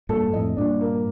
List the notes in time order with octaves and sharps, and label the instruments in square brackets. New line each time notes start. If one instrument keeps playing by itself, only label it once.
[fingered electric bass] G2 A#2 [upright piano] A4
[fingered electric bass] F2 A2 [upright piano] D#5
[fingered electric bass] G2 A#2 [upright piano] D4
[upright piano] A#3